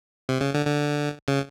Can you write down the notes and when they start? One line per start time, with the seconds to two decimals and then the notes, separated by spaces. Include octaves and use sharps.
0.29 C3
0.41 C#3
0.54 D3
0.66 D3
1.28 C#3